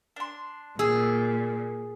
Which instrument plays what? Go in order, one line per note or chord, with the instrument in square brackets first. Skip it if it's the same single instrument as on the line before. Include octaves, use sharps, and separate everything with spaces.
[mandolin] D4 C6
[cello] A#2 [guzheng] G#4 [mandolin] E6